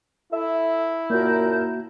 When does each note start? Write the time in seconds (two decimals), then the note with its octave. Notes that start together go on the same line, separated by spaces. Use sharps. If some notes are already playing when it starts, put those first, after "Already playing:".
0.32 E4 A4 E5
1.10 F#2 A#2 A#3 F#4 A#4 A5 G6